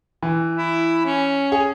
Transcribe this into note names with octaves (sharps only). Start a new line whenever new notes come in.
E3
E4
C#4
G#4